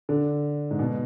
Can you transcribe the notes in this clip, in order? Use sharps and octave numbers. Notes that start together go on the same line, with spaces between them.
D3
G#2
B2